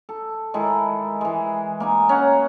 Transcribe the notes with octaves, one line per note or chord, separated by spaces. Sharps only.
A4
D#3 G#3 E4 A4
E3 G#3
A#3 D#4 G#5
C#4 F#5 A#5